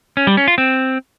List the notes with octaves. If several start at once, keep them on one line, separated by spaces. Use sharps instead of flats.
C#4
G3
C#4
F4
C4